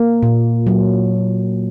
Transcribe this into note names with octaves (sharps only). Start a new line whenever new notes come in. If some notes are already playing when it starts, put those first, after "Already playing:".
Already playing: A#3
A#2
F#3